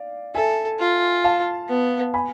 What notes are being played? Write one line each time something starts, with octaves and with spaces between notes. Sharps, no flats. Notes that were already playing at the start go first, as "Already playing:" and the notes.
Already playing: D5 F5
A4 E5 G#5
F4
F5 A5
B3
G#5 B5